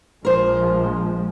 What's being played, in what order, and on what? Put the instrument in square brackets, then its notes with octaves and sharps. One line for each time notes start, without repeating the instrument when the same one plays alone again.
[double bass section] A#1 F3 G#3 [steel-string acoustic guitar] A#4 C5